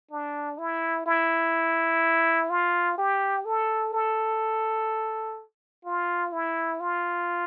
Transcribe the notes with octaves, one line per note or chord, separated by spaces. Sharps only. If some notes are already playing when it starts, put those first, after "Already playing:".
D4
E4
E4
F4
G4
A4
A4
F4
E4
F4